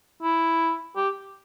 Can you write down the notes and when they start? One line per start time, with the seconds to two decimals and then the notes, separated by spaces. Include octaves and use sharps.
0.23 E4
0.96 G4